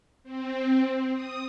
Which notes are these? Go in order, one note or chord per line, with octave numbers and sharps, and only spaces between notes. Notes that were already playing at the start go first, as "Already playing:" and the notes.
C4
D#6